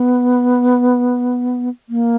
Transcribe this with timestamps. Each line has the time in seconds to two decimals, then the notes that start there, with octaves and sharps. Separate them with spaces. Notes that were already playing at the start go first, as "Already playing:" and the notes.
Already playing: B3
1.89 A#3